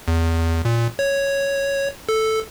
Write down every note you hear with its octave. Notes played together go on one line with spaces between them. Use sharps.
E2
A#2
C#5
A4